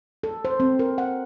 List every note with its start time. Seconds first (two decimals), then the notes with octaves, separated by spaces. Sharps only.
0.23 A4
0.45 C5
0.60 C4
0.79 A#4
0.98 F#5